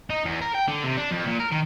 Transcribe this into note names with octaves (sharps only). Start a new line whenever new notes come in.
D#4
E2
A#4
G5
D3
C3
D4
F2
A#2
A#4
D#3